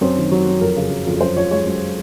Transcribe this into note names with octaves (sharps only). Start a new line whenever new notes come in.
F#2 C4
D#3
F#3
F#2
F2 A#4
C#3
F#3
F2
F#2 C5
F3 C#5
G#3 C#5
F#2